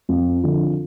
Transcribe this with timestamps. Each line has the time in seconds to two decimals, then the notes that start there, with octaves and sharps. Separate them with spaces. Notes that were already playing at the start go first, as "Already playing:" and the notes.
0.09 F2 F4
0.43 D3 F3